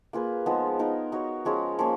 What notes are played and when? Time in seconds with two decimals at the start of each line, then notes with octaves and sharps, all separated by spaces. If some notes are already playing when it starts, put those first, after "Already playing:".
0.13 A#3 F4 G#4 B4
0.46 F3 G#3 B3 D#4
0.79 B3 D#4 A#4 D#5
1.12 D#4 F#4 C#5
1.45 F3 G#3 C#4 G#4
1.79 F3 A#3 C#4